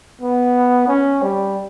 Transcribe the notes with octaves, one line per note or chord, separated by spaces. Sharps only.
B3
C#4
G3